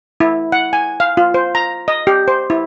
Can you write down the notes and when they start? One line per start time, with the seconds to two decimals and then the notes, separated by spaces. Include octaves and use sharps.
0.20 E4
0.52 F#5
0.73 G#5
1.00 F5
1.17 F4
1.34 C5
1.55 A#5
1.88 D#5
2.07 G4
2.28 C5
2.50 E4